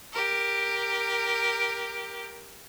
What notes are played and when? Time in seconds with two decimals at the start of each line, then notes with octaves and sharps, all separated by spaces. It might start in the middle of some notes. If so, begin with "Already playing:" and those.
0.13 G4 A#4